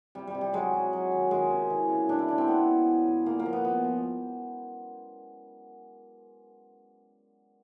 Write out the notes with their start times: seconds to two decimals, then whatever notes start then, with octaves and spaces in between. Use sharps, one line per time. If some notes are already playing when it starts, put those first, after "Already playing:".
0.15 C3 G3
0.27 G3
0.35 C3
0.41 G3
0.53 F#3 G#3
0.74 F#3
0.93 F#3
1.12 D#3
1.31 D#3 G#3
1.51 C3
1.70 E3
1.89 C#3
2.09 C#3 D4
2.19 E4
2.28 E3 D4
2.38 C4
2.48 C#3 B3
2.67 C#3
2.88 C#3
3.07 C#3
3.26 A#2 A#3
3.39 A#3
3.46 F3
3.53 B3
3.65 F3 B3
3.84 F3